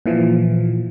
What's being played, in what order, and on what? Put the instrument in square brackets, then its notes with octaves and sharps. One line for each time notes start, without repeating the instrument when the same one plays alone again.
[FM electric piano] A#2 E3 F3